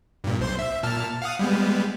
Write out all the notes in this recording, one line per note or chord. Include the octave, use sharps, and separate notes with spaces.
G2 A#2
B1 C5 C6
E5
A#2 A5 F6
F5 F#5 D#6
G3 G#3 B3